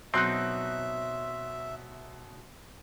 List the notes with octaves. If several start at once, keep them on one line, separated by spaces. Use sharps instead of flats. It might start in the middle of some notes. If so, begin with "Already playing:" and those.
B2 F#3 C4 D#4 E5 C6 F#6